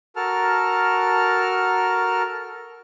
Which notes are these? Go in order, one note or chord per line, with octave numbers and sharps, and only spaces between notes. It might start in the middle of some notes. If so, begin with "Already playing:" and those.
F#4 A4 A#4 A5 F6